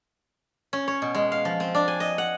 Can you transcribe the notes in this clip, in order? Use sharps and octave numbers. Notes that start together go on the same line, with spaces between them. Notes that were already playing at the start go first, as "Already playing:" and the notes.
C#4
C#5
B2
G#3
F5
F3
C4
D4
G#5
D#5
F#5